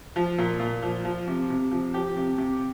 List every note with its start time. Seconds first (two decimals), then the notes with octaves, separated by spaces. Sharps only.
0.16 F3
0.38 A#2
0.60 A#2
0.83 F3
1.05 F3
1.27 C3
1.50 C3
1.71 F3
1.94 F3 G4
2.17 C3
2.38 C3